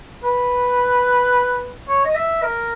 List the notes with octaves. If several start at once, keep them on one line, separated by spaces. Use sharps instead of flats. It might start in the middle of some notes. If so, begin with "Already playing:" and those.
B4
C#5
D#5
E5
A#4